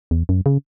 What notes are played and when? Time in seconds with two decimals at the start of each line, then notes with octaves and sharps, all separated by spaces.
0.11 E2
0.29 F#2
0.46 C#3